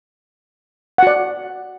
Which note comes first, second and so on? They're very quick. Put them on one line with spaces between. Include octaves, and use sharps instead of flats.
F#5 F#4 D5